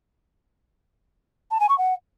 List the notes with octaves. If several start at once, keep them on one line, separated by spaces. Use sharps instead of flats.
A5
G#5
C#6
F#5